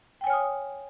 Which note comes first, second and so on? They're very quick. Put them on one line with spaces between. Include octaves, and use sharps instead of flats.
G5 G#5 C#5 F6 D#6